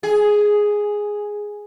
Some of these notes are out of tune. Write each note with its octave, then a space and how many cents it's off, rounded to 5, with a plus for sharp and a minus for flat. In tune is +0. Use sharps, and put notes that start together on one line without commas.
G#4 +0